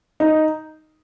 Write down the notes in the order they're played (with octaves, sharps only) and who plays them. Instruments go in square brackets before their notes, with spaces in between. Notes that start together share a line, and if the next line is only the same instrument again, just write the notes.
[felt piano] D#4